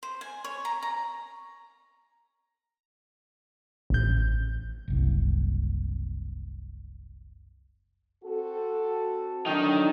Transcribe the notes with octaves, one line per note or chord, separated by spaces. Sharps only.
C5
G#5
C#5
A#5
A#5
A1 G6
F#1 C2
C4 F#4 A4
F#3 D4 D#4 G5